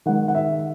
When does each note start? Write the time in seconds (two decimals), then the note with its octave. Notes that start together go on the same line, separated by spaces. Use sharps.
0.06 D#3 G#3 D#4 F#5
0.28 F#5
0.35 E5